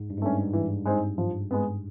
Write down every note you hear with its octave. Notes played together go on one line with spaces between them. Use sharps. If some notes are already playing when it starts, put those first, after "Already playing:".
Already playing: G#2
G2
G#2
G2 A3 C#4
G#2
E3
G#3 C4 D#4
F3
G#3 B3